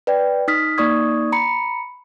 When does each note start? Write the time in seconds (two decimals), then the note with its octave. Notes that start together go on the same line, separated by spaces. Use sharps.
0.07 B4 D5 G5
0.48 D#4 D#6 F6 B6
0.78 A#3 D#4 D5 C#6 D#6 G#6
1.32 A#5 B5 C#7